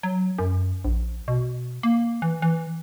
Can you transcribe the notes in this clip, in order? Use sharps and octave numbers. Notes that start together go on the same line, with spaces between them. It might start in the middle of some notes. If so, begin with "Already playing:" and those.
F#3
F#2
A#1
B2
A#3
E3
E3